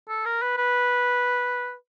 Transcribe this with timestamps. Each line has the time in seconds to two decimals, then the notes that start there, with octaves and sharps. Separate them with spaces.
0.09 A4
0.25 A#4
0.42 B4
0.57 B4